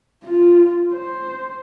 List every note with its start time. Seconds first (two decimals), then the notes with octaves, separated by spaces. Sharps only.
0.25 F4
0.93 C5